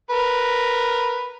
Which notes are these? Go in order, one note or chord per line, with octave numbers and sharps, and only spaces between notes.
A#4 B4